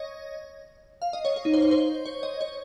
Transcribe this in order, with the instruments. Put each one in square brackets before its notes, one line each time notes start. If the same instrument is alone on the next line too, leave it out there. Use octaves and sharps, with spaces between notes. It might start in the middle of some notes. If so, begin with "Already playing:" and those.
Already playing: [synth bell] C#5 D#5
F5
D#5
C#5
C#5
D#4
C5
C#5
C5
C#5
D#5
C#5